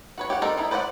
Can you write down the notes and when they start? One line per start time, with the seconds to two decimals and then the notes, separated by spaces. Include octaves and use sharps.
0.18 F#4 B4 C#5
0.30 G4 C#5 F#5
0.42 D4 D#4 A4 A#4 C5
0.57 G3 D#4 E4
0.71 B4 C5 D5 D#5 F#5